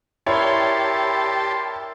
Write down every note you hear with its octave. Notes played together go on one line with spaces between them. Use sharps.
E4 G4 A#4 C#5 D5 A5 C6